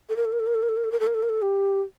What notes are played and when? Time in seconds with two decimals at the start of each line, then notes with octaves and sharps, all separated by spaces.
0.09 A4
0.16 A#4
0.25 A4
0.32 A#4
0.40 A4
0.47 A#4
0.55 A4
0.62 A#4
0.69 A4
0.77 A#4
0.84 A4
0.92 A#4
1.00 A4
1.07 A#4
1.14 A4
1.23 A#4
1.29 A4
1.42 G4